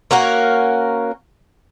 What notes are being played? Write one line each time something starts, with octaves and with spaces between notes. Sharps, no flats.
A#3 C#4 F#4 A#4